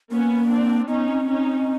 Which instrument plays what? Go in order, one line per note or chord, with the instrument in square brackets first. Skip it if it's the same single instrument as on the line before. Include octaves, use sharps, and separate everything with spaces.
[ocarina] A#3 [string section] B3 C#4
[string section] C4 D4
[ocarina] B3 [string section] C#4 D#4
[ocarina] C4
[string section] C#4 D#4